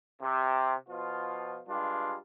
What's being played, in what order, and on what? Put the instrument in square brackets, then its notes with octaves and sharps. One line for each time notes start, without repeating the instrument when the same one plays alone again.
[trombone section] C3
B2 F3 F4
G2 G3 G#3 D4 F4